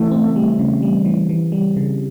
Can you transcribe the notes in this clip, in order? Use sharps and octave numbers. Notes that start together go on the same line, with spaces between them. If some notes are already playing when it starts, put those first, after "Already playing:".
Already playing: C#3 E3 A3 C4
C4
G3
C#3
G3
E3
E3
G3
C#3